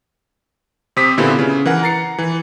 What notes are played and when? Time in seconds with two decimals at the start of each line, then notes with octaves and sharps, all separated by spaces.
0.96 C3 C4 D#6 B6
1.17 A#2 D3 B3 C4 E4 G4
1.39 C#3
1.65 E3 A#4 F#5
1.83 A#5 A6 C7 C#7
2.18 E3